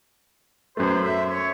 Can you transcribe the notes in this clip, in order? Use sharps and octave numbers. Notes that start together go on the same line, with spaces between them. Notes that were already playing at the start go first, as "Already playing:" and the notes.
F#2 A3 B4 C5
E5
C#5